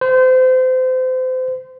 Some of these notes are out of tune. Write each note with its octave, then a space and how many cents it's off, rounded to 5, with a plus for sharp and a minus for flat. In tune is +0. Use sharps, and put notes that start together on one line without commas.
C5 -30